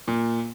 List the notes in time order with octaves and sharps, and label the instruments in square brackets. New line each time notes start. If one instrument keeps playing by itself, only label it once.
[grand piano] A#2